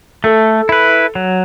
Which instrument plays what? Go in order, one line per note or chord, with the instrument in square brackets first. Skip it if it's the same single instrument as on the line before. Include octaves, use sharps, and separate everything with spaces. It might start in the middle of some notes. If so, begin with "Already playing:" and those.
[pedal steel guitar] A3 [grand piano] A4
[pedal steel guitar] E4 B4
F#3